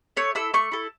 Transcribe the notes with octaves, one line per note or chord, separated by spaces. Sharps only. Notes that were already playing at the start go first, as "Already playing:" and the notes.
A3 C#5
E4 A4 E6
A3 C#6
E4 A4